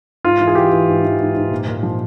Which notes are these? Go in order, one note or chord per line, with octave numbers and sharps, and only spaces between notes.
G#2 F4
E3
G#4
E3 G4
E3
G#2
E3
G#2
G#2
A#2
A#2
F3